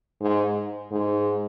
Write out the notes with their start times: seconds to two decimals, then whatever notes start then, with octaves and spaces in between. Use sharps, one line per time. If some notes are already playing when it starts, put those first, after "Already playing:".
0.21 G#2
0.92 G#2